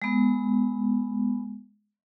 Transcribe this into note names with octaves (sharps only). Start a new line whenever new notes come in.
G#3 B3